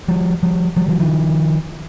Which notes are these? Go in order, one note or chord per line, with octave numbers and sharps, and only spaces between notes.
F3 G3
F3 G3
F3 G3
E3 F#3
D#3 F3